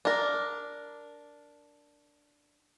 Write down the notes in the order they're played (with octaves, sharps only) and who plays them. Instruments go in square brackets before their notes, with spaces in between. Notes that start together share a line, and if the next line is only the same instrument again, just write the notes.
[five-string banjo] D4 A#4